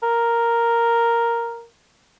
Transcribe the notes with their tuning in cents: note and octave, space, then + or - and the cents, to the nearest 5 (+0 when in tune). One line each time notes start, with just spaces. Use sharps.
A#4 +0